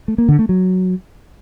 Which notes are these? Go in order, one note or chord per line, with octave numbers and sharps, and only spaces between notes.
A3
A#3
D3
A3
F#3